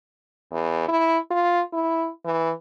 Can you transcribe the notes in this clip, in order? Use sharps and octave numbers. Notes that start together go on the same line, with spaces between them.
E2
E4
F4
E4
E3